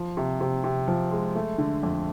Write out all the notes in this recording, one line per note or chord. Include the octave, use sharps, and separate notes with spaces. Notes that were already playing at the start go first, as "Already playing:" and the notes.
Already playing: F3
C3
C3
C3
F3
G#3
A3
D3
F2